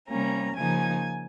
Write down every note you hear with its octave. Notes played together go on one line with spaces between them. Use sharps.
C3 G3 A#3 C#4 A#5
C#3 F3 A#3 D#4 G#5